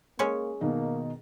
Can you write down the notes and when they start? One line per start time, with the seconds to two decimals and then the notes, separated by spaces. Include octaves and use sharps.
0.19 G#3 A#3 C#4 C#5
0.61 B2 D#3 A#3 D#4